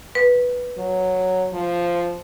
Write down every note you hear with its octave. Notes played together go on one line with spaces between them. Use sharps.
B4
F#3
F3